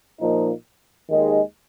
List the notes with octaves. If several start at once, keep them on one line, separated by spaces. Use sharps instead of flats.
A#2 F3 A#3 D#4
D#2 D#3 G#3